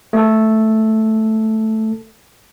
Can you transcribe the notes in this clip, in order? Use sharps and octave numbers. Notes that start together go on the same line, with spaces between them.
A3 A4